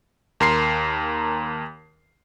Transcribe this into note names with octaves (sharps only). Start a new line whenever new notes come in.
D#2 A#4 C6 C7